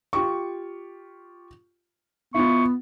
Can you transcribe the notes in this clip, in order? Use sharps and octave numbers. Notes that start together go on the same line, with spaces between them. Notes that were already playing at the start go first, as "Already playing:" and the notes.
F4 G4 C#6
B3 E4 F4 C#6